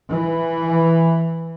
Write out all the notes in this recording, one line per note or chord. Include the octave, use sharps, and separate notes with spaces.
E3